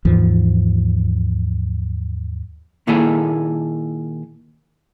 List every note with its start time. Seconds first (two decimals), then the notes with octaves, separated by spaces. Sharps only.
0.05 D#2 G#2 E3 F3
2.87 A#2 D#3 A#3 E4 G#4 A4